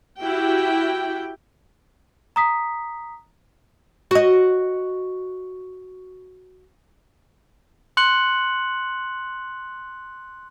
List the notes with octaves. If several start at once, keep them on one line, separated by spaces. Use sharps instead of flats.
E4 F#4 G4 G5
A#5 D#6 B6
F#4 D#5
C6 F#6 C#7 F#7